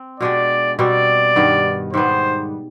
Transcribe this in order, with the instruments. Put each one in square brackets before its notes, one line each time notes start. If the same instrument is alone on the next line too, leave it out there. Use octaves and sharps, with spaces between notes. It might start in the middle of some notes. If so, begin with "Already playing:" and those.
Already playing: [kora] C4
[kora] B2 G#3 D4 G4 [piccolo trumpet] D5
[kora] B2 G3 C4 [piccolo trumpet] D5
[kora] G2 D#3 B3
[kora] G#2 G3 B3 [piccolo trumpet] C5